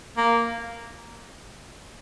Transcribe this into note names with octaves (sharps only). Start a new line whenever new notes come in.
A#3